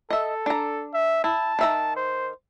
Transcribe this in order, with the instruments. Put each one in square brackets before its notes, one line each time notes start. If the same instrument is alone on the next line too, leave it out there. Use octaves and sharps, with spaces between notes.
[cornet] A4 [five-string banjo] D#5 E5
[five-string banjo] D4 A#5
[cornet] E5
[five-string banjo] E4 [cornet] A5
[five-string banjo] D#3 E5 A#5
[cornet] C5